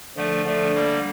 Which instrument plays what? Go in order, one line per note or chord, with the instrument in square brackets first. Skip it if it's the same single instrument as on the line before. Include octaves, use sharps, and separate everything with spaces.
[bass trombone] D3 [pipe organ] F3 A3
[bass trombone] D3 [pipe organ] F3 A3
[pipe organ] G3 A#3